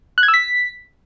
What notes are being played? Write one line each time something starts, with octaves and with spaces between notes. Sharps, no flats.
F#6
G#6
E6
B6